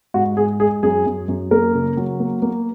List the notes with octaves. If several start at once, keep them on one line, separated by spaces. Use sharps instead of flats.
G#2 F#4
G#2 G#4
G#3 G#4
F#2 G#4
F#2
F#2
A#3 A#4
C#3
F#3
A#3
A#3